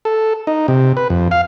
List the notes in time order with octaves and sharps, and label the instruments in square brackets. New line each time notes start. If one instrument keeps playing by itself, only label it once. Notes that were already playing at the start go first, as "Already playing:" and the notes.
[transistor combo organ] A4
D#4
C3
B4
F2
F5